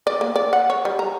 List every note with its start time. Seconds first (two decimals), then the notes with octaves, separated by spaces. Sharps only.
0.07 D5
0.21 A#3
0.36 D5
0.53 F#5
0.70 C#5
0.85 G3
0.99 A#5